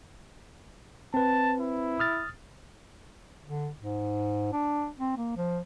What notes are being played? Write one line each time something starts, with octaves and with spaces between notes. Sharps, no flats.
C4 B4 A5
E4
D#6 F6 A6
D3
G#2
D4
C4
A#3
F3